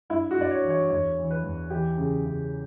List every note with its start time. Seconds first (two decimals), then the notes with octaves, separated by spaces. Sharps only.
0.10 G2 E4
0.31 F#4
0.38 G2 D5
0.51 C#5
0.63 E3
0.70 C#5
0.90 E2 C#5
1.18 E3
1.31 B4
1.44 E2
1.70 E3 G4
1.98 C#3
2.24 C#3